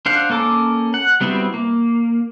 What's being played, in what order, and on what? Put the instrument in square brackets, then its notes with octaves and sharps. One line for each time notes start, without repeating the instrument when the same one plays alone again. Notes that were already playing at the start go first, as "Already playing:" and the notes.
[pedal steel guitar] D4 C5 F5 F#5
A#3 C#4 A4 A#4 D6
F#5
G3 B3 C4 E4 F#4
A#3